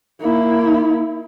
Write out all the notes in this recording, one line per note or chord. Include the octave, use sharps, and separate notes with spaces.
A#3 E4